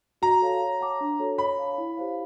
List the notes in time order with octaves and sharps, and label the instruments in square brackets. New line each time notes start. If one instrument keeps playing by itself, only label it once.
[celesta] F#4 [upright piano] A#5
[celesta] A4 C#5 F5 A5
C#5
F#5 A5 D6
D4
F#4 A4 C#5
[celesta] C#5 [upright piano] B5
[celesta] F5 A5
E4
G4 C5 F5